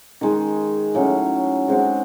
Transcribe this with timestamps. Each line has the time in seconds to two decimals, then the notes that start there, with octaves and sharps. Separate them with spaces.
0.21 D#3 G#3 D#4
0.95 A2 F#3 C#4
1.68 G#3 C4 F#4